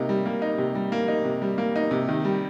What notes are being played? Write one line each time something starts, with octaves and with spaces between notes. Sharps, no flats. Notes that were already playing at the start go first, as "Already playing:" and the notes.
Already playing: C3 A#3 D#4
G3
A#3
D#4
C3
G3
A#3
D#4
C3
G3
A#3
D#4
C3
D#3
G3